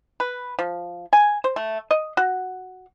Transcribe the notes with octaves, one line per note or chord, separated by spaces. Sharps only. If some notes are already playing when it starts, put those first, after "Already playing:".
B4
F3
G#5
C5
A3
D#5
F#4